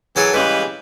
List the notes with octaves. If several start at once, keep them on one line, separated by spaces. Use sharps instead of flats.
E3 F#3 G#4 A4 G#5
C#3 E3 G3 G#3 B4